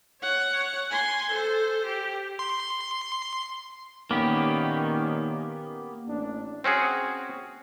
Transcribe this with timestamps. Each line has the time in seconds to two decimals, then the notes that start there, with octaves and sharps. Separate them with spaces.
0.21 C#5 F#5
0.91 G#5 C6
1.31 A4 C5
1.86 G4
2.39 C6
4.11 A#2 D#3 A#3 B3 C#4 G4
6.06 A1 D4
6.64 C4 C#4 F#4 G#4